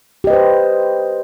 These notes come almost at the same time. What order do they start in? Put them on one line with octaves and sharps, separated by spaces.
G4 D#5 B4 C5